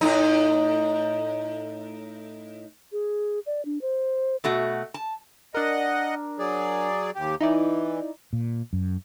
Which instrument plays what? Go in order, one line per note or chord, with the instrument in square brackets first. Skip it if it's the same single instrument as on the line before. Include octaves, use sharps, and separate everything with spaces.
[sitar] A2 D#4
[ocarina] G#4
D5
D4
C5
[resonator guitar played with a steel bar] B2 A3 F#4
A5
[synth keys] D4 A#4 [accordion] D#5 F#5
[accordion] F#3 G#4 D5
D#2 G4
[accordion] E3 [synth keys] D#4 E4 D5
[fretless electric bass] A#2
F#2